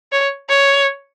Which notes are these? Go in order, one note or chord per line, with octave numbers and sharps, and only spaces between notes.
C#5
C#5